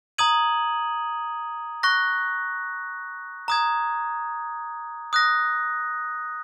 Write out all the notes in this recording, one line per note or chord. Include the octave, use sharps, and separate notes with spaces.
A#5 D#6 G#6 D#7 F#7
C#6 F#6 A#6
A#5 D#6 G#6
D#6 F#6 A#6